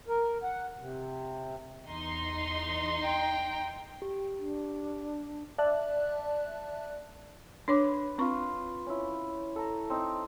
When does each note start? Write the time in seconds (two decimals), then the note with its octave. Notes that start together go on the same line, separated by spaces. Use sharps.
0.08 A#4
0.43 F#5
0.79 C3
1.84 E2 D#4 C6
3.00 G5 A#5
4.02 G4
4.39 D4
5.58 D5 E5 A5 F#6
7.68 D4 B4 C#5 D6
8.18 C4 F4 B4 C#6
8.86 C#4 E4
9.56 A4 A#5
9.90 C4 D#4